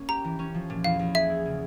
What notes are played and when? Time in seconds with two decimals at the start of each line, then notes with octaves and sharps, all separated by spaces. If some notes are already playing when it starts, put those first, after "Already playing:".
Already playing: A#3 C#4
0.09 G4 A#5
0.25 E3
0.39 C#4
0.54 F3
0.70 A#2
0.84 E2 F5
0.99 E2
1.15 G#4 E5
1.30 E4
1.45 C#3